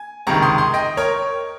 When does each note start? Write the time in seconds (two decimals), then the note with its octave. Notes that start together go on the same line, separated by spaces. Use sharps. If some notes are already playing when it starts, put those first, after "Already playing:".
Already playing: G#5
0.27 C#2 C3 D#3 A#5 C#6
0.42 C6 D#6
0.58 C6 D#6
0.74 D#5 G5
0.97 A#4 C#5